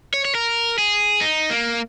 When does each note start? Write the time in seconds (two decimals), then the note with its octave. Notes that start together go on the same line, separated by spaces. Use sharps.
0.14 C#5
0.25 C#5
0.35 A#4
0.78 G#4
1.21 D#4
1.50 A#3